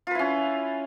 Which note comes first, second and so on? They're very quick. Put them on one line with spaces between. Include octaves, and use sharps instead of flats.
F4 B4 E4 C#4